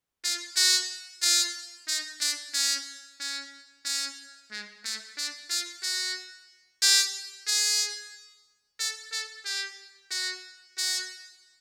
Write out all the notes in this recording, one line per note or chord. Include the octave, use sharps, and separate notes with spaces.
F4
F#4
F4
D#4
D4
C#4
C#4
C#4
G#3
A3
D4
F4
F#4
G4
G#4
A4
A4
G4
F#4
F#4